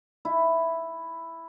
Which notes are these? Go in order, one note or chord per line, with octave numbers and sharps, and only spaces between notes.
E4